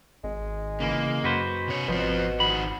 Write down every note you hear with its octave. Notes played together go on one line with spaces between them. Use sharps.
G#1 G#3
C#3 E3 A#3
F#2 F#4 B4 C5
C3 C#5
G#1 B2 F3 C4
D#3 F#4 B5